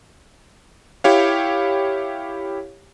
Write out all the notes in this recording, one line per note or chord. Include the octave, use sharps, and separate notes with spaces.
E4 G4 C#5 F5